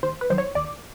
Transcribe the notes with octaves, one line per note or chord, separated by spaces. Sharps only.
D#2 C5
B4
D#3 F#3 C5
C#5
D#2 D5